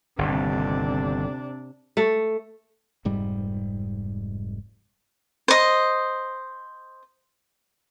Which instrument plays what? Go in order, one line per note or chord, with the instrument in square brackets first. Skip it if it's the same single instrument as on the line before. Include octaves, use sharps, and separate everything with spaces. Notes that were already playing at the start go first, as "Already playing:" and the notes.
[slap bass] G1 D#2 [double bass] C3 D4
[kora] A3
[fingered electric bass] F1 G#2 G3
[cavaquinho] C5 D#5